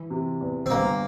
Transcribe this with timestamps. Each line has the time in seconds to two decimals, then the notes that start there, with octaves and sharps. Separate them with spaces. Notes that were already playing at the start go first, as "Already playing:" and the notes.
Already playing: E3
0.10 C3
0.41 E2
0.66 C4
0.70 G1 A#3